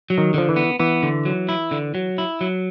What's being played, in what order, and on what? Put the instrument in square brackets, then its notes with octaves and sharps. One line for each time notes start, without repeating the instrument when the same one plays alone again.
[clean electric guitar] F#3
[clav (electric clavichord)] D#3
[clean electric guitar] D3 [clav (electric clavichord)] F3
[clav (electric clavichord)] E3
[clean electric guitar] B3
[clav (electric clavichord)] E3 [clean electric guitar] B3
[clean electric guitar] D3
F#3
E4
D3
F#3
E4
F#3